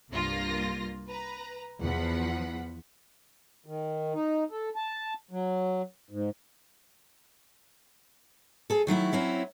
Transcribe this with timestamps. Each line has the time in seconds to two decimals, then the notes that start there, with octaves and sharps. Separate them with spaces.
0.11 C2 G2 A#3 F4 A#6
1.08 B4 A#5
1.82 E2 F3 F#5 B5
3.66 D#3
4.14 D#4
4.51 A4
4.76 A5
5.31 F#3
6.11 G#2
8.70 G#4 A4
8.87 D#3 F#3 A3 E4
9.13 F#3 C4 C#4 E4